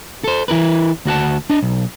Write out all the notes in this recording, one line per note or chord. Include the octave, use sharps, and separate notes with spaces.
A4 C5
E3 E4 A#4 B4
D2 F#4 F#5 A5
D4 D#5
B1